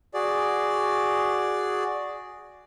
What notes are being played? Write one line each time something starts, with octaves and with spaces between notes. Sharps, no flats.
F#4 G#4 D5